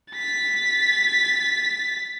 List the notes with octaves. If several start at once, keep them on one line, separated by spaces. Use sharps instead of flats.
A6 B6